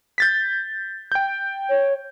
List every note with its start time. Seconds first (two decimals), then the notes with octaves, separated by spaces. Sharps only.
0.18 G6 A6 B6
1.12 G5 G6
1.69 C#5